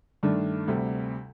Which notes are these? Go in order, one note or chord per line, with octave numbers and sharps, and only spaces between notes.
G2 D#3 A3 D4
D2 C3 G3